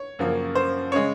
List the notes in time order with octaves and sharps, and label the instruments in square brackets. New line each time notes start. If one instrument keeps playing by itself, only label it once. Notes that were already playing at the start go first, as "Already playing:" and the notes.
Already playing: [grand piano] C#5
F#2 C#3 F3 A#3
C5
C#3 G#3 C#5